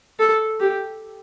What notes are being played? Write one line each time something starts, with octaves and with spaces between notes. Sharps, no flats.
A4
G4